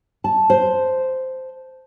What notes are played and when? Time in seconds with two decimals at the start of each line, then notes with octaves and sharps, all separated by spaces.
0.24 A5
0.50 C5